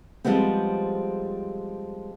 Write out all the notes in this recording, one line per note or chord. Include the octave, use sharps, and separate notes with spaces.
F3 G3 G#3 B3 C4